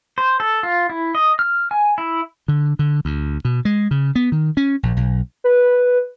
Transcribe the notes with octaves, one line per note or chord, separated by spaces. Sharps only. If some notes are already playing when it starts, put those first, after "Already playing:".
C5
A4
F4
E4
D#5
F6
G#5
E4
D3
D3
D2
B2
G#3
C#3
B3
D#3
C#4
A#1
B1
B4